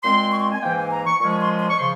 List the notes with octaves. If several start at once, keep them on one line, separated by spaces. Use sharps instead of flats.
A#2 G#3 C4 C6
C#6
C6
G#5
G#2 E3 A#3 G5
G#5
A#5
C#6
A#2 F3 G#3 C#4 C#6
C#6
C6
C6
C#6
C#3 F3 C6